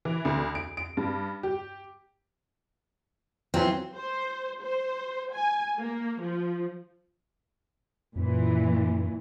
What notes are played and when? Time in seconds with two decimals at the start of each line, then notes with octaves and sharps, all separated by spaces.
0.05 E3
0.25 D2
0.55 D7
0.77 D7
0.97 G2
1.43 G4
3.54 E3 F#3 C4 F4
3.96 C5
4.62 C5
5.33 G#5
5.80 A#3
6.23 F3
8.16 F#2 A#2 E3